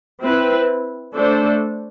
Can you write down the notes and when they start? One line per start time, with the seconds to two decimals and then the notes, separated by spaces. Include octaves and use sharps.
0.21 C4 E4 B4
1.14 A3 D4 A4 C5